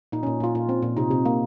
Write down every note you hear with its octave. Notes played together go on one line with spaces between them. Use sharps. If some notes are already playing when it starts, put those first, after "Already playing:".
A#2 D#4
C#4
A#2
A#2 F4
A#2 F4
C4
A#2
C3 D#4
C3
A#3